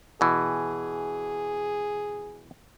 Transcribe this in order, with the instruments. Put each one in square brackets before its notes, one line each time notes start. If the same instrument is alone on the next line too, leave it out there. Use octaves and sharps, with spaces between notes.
[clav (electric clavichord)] B2 E3 [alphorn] G#4